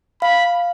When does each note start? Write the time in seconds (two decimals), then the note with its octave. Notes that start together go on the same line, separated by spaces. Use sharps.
0.22 F5 B5